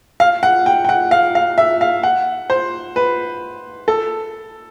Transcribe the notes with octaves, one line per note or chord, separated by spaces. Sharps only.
F5
F#5
G5
G5
F#5
F5
F5
E5
F5
F#5
C5
B4
A4